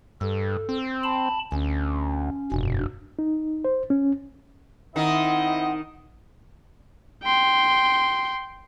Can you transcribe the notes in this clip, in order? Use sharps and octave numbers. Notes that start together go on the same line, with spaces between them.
G2 A4
C4
A5 B5
D2 C#4
F1 G2 B2
D#4
C5
C#4
D#3 C4 D#4 E4 D#5 F#5
G5 C6